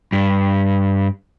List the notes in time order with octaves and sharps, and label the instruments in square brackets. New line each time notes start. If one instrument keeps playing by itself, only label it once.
[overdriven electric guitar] G2